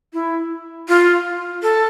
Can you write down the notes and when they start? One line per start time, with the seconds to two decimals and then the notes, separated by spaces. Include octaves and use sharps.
0.13 E4
0.89 F4
1.63 A4